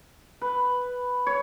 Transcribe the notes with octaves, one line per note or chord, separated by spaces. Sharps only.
B4
C#5